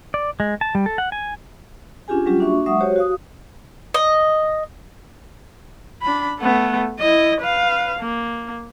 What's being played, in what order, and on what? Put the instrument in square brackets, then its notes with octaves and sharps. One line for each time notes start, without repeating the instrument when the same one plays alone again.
[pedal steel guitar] D5
G#3
A5
G3
A4
F#5
G#5
[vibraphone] C#4 D4 F4 G4 G#4 G#5
F#3 G3 C#4 F4 G4
A#3 D4 F#4 E5 C#6
F#3 G#3 E5 F#5 C#6 D#6
F#4 G4 C5 C#5
F#4 F5 D#6
[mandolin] D#5
[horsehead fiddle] D4 B5
A3 B3
E4 D#5
B4 F5
A#3